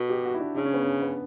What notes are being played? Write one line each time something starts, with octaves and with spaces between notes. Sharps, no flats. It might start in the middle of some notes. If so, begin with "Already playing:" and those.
Already playing: B2 A4
G4
F#4
E4
D4
C#3 D4
C#4
B3
C#4
B3